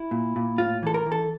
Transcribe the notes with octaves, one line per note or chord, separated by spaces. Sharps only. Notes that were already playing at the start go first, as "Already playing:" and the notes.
Already playing: E4
A#2
A#2
A2 F4
E3 A4
A#4
E3
A4